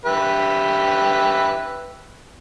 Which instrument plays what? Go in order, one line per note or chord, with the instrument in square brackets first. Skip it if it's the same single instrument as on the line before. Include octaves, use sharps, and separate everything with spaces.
[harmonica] G4 B4 E5